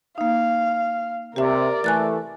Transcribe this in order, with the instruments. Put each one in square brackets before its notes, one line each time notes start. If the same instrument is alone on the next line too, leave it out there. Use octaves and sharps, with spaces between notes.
[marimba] A#3 D#4 [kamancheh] F5
[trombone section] C3 [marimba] G4 E5 [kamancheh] A#4 D5
[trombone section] E3 A3 [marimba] G#5 F#6 A6